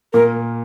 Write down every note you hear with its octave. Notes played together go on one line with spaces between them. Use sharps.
A#2 A#4